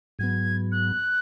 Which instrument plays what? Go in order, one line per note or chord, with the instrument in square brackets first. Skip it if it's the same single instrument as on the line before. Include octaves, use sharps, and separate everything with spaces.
[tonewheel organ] G#2 F#3 B3 [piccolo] G#6
[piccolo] F#6